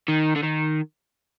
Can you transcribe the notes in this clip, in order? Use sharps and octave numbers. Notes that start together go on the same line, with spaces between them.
D#3
D3
D#3